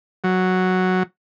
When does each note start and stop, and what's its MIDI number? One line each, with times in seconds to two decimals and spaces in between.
0.24 1.03 54